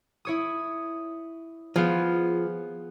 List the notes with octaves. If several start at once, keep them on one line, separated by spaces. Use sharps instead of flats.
E4 C#5 D#6
F3 B3 F4 G#4